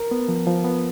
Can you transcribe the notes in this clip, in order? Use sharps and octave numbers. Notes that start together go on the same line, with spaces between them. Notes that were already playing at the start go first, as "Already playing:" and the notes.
Already playing: A#4
B3
F3
F3
B3